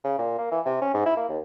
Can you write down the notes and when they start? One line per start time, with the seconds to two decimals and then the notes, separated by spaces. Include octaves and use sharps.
0.04 C#3
0.19 A#2
0.38 A#3
0.52 E3
0.66 C3
0.82 C#4
0.94 G#2
1.06 E4
1.17 A#3
1.29 D#2